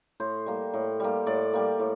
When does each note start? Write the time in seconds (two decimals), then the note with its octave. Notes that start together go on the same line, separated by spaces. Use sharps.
0.20 A2 C5
0.46 G3 A#3
0.74 A2
1.00 G3 A#3
1.26 A2 D5
1.53 G3 A#3
1.79 A2